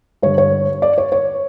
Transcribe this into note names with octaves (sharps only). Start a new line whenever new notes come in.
G2 D3 C#5
C#5
D5
C#5
C#5